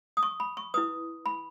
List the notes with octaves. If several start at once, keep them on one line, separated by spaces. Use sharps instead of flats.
D#6
C#6
B5
C#6
E4 B4 D#6
B5